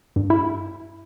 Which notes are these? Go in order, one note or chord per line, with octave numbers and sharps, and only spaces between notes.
G2
E4